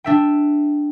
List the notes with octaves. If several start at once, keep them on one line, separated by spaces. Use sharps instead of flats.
D4 E5 G5